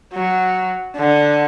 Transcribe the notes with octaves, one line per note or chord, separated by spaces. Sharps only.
F#3
D3